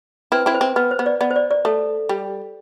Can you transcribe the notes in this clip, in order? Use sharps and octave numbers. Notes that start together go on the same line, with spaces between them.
C4 E4 B4
C4 E4
C5
C4
B3 B4
C5
B3
D5
B3 D5
C5
D5
D5
A3 A4
G3